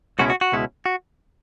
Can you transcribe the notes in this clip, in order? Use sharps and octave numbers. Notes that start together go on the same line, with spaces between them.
C#2 B2 G#3 C#4 E4 F#4
F#4
F#4
C#2 B2 G#3 C#4 E4
F#4